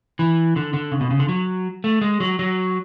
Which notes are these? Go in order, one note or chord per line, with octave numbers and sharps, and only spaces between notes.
E3
D3
D3
C#3
B2
C#3
D3
F#3
A3
G#3
F#3
F#3